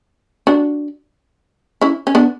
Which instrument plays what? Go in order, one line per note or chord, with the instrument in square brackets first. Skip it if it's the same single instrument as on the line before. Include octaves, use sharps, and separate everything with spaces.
[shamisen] D4 F#4
C#4 E4
C#4
B3 D4